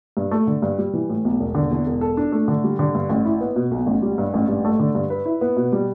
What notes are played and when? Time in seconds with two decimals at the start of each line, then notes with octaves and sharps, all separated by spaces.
0.17 G2
0.31 A3
0.47 D3
0.62 G2
0.78 G3
0.93 E3
1.09 A2
1.25 B1
1.40 E1
1.55 D3
1.71 E2
1.87 E1
2.01 A4
2.17 D4
2.32 A3
2.48 D3
2.64 G3
2.79 D3
2.95 G2
3.10 A1
3.25 E4
3.41 B3
3.56 B2
3.71 B1
3.86 A1
4.02 G3
4.18 G2
4.34 A1
4.48 G2
4.65 A3
4.80 D3
4.95 G2
5.10 B4
5.25 E4
5.41 B3
5.56 B2
5.72 G3